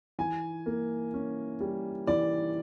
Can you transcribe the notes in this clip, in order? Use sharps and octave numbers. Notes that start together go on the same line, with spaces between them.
E3 G#5
A#3
C#4
G3
E3 D5